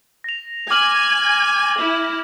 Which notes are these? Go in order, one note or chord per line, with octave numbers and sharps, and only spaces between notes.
A#6 F7
G#5 D6 F6 F#7
E4